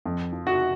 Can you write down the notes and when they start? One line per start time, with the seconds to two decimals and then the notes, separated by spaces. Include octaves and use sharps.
0.05 F2
0.33 F3
0.47 F#4 F#5